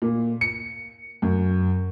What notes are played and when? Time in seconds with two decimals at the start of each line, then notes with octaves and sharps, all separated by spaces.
0.02 A#2
0.41 C#7
1.22 F#2